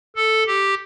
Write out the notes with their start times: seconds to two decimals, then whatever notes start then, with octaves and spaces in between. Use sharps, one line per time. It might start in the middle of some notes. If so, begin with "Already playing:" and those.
0.16 A4
0.47 G4